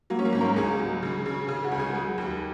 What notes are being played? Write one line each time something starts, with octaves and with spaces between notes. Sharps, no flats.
F#3 A#3
C#4
A#3
G#2
A#4
C#2 G#4
F#3
C#3
C#3
C#3 G#4
F#4
C#2
G#4
F#3 G#4
D#2